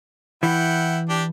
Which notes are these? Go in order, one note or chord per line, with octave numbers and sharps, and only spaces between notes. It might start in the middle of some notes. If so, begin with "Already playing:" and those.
E3 E4 F#5 G5
D4 G4